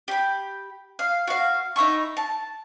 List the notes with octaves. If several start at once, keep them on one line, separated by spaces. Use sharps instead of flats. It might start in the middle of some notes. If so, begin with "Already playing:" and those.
G4 B5
F5
F#4 F5
D#4 E4 E5 C#6
A5